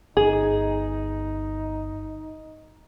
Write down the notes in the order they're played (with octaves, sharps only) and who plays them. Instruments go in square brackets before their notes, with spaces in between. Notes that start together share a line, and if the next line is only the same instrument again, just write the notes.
[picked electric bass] G1 [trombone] D#4 [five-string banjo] G#4